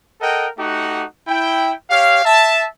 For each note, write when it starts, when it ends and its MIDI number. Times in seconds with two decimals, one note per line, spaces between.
0.21 0.48 69
0.21 0.48 70
0.21 0.48 75
0.21 0.48 78
0.21 0.48 79
0.58 1.04 57
0.58 1.04 63
0.58 1.04 66
0.58 1.04 67
0.58 1.04 78
1.28 1.73 64
1.28 1.73 79
1.90 2.25 67
1.90 2.25 73
1.90 2.25 77
2.25 2.66 76
2.25 2.66 81